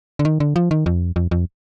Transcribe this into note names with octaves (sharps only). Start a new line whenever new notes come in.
D3
D#3
D3
F3
D#3
F2
F2
F2